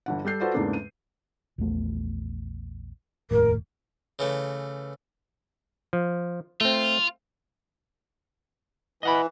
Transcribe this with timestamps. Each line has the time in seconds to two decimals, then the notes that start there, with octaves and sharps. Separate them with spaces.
0.06 G1 D3 F#5
0.25 G3 A4 G6 C7
0.41 F4 F#4 A4 B4 C5 D5
0.54 E2 G#2 C#3 A3 A#3 D4
0.73 D#7
1.58 A#1 E2 A3
3.31 F1 D#2 A2 A#4
4.19 C#3 E3 A3
5.93 F3
6.61 A3 C4 F4
9.03 E3 D#5 F#5 B5